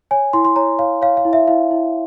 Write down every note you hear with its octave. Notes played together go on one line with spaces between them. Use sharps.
C#5 G#5
E4 C6
C6
C#5 A#5
C#5 F5
C#5 F5
F5
E4
E5
E4 F5
E4